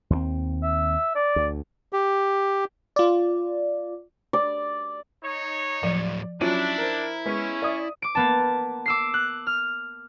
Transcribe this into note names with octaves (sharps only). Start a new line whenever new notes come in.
D#2 G3 C4
E5
D5
D2
G4
F4 D5
D5
D#4 C#5
A2 F3 F#3 D5
F#3 C#4 D4 E4 F4
A#4 C5
G#3 B3 C#4 B6
D5 E5 D#6
D6 D7
A#3 B3 A5
D6 E6 C7
F#6
F6